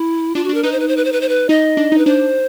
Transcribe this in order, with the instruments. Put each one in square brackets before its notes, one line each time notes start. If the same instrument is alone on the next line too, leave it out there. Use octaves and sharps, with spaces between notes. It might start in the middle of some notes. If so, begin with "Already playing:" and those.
Already playing: [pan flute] E4
[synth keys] D4 [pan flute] F4
[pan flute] F#4
[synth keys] D4
[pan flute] A#4
[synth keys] D#4 [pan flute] B4
[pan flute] C5
B4
C5
B4
C5
B4
C5
B4
[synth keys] D#4 [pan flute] D#5
[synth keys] D4
D#4
[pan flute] B4
[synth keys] D4 [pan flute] C5